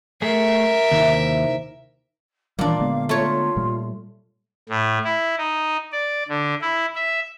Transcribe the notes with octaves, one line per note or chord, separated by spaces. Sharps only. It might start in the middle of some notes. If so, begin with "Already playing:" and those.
A3 G#4 A#4 E5
D#2 C3 D#3 E4
A#2 D#3 E3 G3 D4 F5
D3 G#3 B3
A3 F4 C#5
A#2 G3
A2
E4
D#4
D5
D3
E4
E5